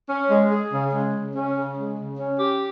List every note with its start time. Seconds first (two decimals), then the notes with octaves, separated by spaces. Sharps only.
0.08 C#4
0.29 G#3
0.51 G#4
0.72 C#3
0.92 G#3
1.13 C#3
1.35 C#4
1.55 C#3
1.76 G#3
1.98 C#3
2.19 C#4
2.39 G4